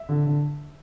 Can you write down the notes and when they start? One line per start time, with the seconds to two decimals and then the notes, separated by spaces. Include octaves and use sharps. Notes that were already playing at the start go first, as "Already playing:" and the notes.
Already playing: E5
0.09 D3
0.26 D3